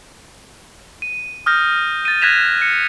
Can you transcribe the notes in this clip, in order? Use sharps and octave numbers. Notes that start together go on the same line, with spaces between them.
D#7
D#6 F6 G6 A#6
A6 D#7
F#6 G#6 A#6 B6 E7 F7
C#7